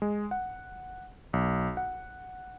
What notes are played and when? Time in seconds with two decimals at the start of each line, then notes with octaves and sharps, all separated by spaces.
0.02 G#3
0.31 F#5
1.33 B1
1.77 F#5